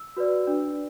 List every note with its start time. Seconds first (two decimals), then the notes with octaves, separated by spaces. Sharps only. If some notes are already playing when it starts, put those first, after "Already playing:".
Already playing: E6
0.17 F#4 B4 D5
0.47 D4